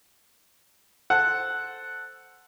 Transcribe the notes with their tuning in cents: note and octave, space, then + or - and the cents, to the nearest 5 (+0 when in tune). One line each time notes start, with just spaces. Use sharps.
A4 +0 C5 +0 F#5 +0